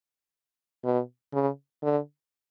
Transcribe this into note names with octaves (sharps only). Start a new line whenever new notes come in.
B2
C#3
D3